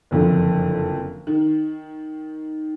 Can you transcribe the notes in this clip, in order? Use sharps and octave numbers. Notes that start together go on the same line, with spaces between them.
F#1 F2 D3
D#3